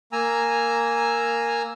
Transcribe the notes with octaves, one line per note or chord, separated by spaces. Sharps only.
A#3 G#5 A#5 E6